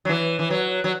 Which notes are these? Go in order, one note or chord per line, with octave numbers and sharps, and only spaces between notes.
F#3
E3
E3
F#3
F#3